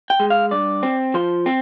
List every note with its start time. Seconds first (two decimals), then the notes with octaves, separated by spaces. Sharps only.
0.10 G5
0.20 G#3
0.30 F5
0.51 G2 D5
0.83 C4
1.14 F3 C5
1.46 C4